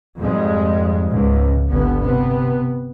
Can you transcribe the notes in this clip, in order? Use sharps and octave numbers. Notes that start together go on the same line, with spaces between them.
F2 G#2 G3 G#3
C#2 G#2
G1 B3
C3 B3